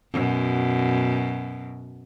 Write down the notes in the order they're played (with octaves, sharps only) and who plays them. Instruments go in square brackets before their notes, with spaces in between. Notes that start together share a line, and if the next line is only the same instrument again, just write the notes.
[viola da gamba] F#2 B2